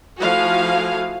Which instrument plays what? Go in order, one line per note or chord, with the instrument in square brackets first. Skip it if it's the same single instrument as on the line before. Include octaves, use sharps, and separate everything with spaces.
[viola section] F3 A3 E4 F#4 F5 G#5